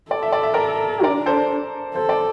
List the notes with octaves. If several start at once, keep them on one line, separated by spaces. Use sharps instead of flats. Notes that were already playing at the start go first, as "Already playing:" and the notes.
A4 D5
E5
D5
E5
A#4 D5
D4 A#4 D5
A4 C5
A4 C5
D5